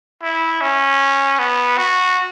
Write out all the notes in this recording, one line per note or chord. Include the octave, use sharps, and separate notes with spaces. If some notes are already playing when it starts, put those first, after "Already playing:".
E4
C#4
B3
F#4